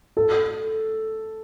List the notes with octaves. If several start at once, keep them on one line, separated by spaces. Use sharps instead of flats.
A4